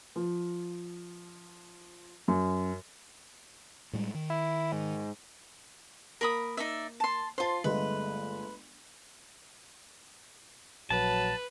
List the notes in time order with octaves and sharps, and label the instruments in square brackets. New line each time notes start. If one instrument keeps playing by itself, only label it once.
[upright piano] F3
F#2
[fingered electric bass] A2 G3 G#3
D#3
[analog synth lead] E4
G#2
[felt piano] A#3 [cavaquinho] A#4 B5 D#6
[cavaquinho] D#4 D5 E5
A5 C6
[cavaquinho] F4 C6 [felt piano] C5 A5
[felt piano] G1 G#3 A3 [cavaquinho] B4
[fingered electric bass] A#1 [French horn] F#3 [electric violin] B4 [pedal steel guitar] A5